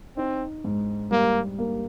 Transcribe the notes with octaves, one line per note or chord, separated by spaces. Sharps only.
C4 D#4
G#2
G3 A#3
A#3